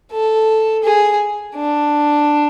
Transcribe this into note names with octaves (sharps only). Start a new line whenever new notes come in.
A4
G#4
D4